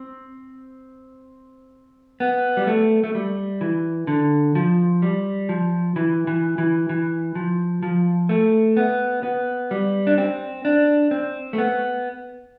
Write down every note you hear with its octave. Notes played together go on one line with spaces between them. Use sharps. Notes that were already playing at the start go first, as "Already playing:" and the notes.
Already playing: C4
B3
G3
A3
A3
G3
E3
D3
F3
G3
F3
E3
E3
E3
E3
F3
F3
A3
B3
B3
G3
D4
C4
D4
C4
A3
B3